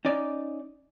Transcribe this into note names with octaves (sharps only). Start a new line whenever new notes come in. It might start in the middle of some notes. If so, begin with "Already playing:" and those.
C#4 D#4 D5